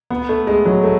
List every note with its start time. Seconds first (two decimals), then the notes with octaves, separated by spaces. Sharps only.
0.10 B3
0.29 A3
0.47 G#3
0.65 F#3
0.84 A3